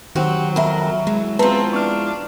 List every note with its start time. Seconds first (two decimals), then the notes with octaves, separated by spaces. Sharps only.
0.15 D#3 F#3 C4 F#4 G4
0.56 F2 A#4 E5 B5
1.07 E3 G#3
1.39 E2 F3 C4 F4 B4 A5 A#5
1.73 D4 C#6 F6